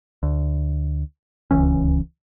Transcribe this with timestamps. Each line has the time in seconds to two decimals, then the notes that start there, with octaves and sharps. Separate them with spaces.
0.23 D2
1.51 D1 C#2 E3 C#4